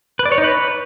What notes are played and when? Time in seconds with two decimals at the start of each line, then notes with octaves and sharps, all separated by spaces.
0.19 B4
0.26 D5
0.32 C#5
0.38 D#4
0.44 B4